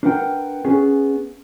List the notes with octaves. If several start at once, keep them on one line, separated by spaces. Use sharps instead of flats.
D4 A#4 B4 F#5 G5
B3 C#4 G#4